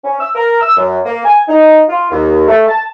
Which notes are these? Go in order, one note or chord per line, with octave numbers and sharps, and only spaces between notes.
C#4
E6
A#4
E6
F#2
A#3
G#5
D#4
F4
D#2
A3
A5